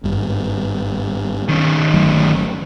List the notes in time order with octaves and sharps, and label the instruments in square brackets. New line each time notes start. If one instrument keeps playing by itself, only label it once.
[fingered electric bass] G#1 G2
[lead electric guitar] D#3 C#4
[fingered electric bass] G1 F#3 A3